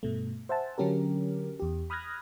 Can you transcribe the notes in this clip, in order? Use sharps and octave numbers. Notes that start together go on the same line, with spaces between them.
G2 B2 A3
C5 E5 F#5 G#5 A5
D3 F#3 C#4 G4 A#4
E2 G4
B5 D#6 F6 F#6 G#6 A#6